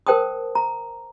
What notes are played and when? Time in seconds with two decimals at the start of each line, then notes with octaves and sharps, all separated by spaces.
0.07 A#4 C5 G5 A5 D#6
0.55 A#5